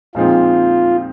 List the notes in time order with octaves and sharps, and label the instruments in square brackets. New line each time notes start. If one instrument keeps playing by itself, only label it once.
[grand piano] A#2 F3 G#3 C4 D#4 [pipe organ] F4